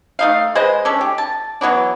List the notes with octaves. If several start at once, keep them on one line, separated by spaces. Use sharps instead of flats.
A3 D#4 F5
G#3 B4 C5 D#5
C#4 D4 A4
G4
A5
E3 F#3 B3 D4